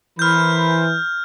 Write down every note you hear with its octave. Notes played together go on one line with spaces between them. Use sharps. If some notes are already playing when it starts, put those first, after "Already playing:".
E3 A#4 C5 B5 F6 G6